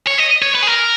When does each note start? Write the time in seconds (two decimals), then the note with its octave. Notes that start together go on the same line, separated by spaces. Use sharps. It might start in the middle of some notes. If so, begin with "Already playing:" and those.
0.07 C#5
0.18 D#5
0.42 C#5
0.55 B4
0.62 G#4
0.67 A#4